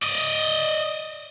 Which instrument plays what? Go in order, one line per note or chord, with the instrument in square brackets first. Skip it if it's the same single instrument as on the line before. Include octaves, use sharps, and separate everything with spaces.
[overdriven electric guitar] D5 D#5